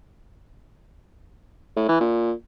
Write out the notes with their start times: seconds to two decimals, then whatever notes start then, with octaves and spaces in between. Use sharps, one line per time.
1.77 A2
1.88 E3
2.00 A#2